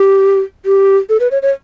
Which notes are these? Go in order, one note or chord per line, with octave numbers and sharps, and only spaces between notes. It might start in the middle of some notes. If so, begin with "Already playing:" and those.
Already playing: G4
G4
A4
B4
C#5
C#5